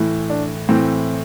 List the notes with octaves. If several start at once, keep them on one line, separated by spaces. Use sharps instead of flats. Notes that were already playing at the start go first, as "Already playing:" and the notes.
Already playing: A2 E3
D4
A2 E3 C4